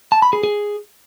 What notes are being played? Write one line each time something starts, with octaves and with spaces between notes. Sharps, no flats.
A5
B5
G#4
G#4